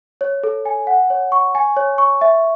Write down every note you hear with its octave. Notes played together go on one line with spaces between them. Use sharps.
C#5
A4
G#5
F#5
C#5
C#6
G#5
C#5
C#6
E5